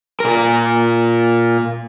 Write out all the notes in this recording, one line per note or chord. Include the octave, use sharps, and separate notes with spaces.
A#2 A#4